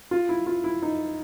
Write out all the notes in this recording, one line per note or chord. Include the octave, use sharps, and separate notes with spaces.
F4
E4
F4
E4
D#4